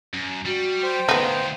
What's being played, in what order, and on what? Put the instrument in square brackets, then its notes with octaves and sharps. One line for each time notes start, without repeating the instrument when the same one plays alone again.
[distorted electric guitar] F#2
[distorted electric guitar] G3 [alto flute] F#4
[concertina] C5 G5
[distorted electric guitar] D2 D#3 [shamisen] B3 D#4 [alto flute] A5
[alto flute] F5